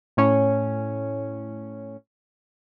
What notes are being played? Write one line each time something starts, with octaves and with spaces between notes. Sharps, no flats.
A2 C#4